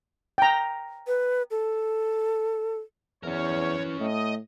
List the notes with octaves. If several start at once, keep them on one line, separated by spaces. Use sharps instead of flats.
G5 A#5
B4
A4
E2 E3 C#4 A#4 C#5
A2 A3 D#5